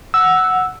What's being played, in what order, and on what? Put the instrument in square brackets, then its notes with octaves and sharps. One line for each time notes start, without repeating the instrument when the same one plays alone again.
[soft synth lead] F#5 [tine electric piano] E6